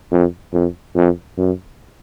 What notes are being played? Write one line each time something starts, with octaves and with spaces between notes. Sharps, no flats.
F2
F2
F2
F#2